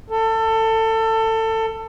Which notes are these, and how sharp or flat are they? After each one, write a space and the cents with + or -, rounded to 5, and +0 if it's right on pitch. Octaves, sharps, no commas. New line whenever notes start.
A4 +25